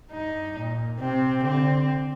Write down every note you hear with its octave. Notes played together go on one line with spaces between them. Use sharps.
G2 D#4
A#2
C3 C4
D3 C4